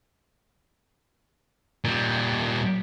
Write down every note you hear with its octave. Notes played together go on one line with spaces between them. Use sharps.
A#2 G3